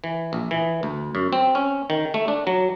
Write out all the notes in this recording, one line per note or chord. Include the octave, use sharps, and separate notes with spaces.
E3
A#1
E3
D2
F#2
C4
C#4
D#3
A3
D4
F#3